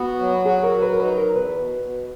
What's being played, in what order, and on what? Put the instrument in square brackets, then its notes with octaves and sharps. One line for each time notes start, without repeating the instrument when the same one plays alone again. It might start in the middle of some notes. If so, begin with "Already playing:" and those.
Already playing: [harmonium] B3 F#4
F#3
[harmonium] F#4 [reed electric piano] G#4
[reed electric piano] A#4
[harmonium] F#3
[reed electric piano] B4
A#4
[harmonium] D#4 [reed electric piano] B4
[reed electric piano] A#4
[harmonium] E2
[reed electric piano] B4
[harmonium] B2
B2